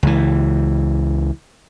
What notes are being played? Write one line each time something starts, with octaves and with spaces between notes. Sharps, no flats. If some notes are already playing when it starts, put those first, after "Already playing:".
C#2 E3